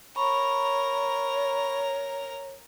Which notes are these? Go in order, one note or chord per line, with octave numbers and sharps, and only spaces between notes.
A#4 C#5 A#5 B5 C#6